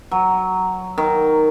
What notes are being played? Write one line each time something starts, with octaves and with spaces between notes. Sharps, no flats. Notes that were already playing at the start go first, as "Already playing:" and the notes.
F#3
D#3